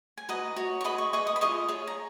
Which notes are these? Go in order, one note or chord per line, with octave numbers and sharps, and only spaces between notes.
G#5
F#4 B4 D#5 A#5
F#4 C#5
C#6
G#4 B4 D#5 B5
C#6
G#4 B4 D#5 C#6
D#6
B5
F4 G#4 D#5 C#6
G#4 C#5
A#5